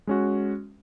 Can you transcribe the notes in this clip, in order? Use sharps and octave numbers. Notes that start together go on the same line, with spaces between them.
G#3 C#4 F#4